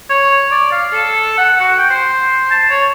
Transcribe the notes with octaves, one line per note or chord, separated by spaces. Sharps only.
C#5
D5
F5
A4
F#5
F#4
G5
C5
A5
C#5